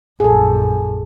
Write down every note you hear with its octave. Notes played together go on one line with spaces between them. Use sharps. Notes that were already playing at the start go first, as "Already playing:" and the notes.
A#1 F#2 G#4 A4